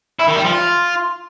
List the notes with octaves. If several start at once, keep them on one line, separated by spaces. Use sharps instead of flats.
E4
D#3
G3
F3
F4